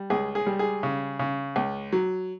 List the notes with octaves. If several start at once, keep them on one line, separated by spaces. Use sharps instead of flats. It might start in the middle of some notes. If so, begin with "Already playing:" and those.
Already playing: G3
C#2 G#4
G#4
G3
G#4
C#3
C#3
C#2
F#3